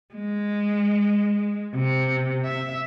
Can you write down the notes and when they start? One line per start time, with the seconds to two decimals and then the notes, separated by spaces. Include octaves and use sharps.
0.14 G#3
1.74 C3
2.44 E5